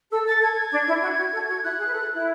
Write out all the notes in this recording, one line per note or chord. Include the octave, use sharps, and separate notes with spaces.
A4 E6
A4 A6
A4 G#6
D4
E4
F#4
F#4
A4
F#4
E4 F#6
G#4
B4
A4
E4